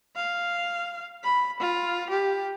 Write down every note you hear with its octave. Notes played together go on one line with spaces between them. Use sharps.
F5
B5
F4
G4